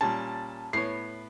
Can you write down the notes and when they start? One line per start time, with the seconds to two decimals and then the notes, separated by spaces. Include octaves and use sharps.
0.01 A#2 G3 C#4 A5
0.73 A2 B3 C#5 C7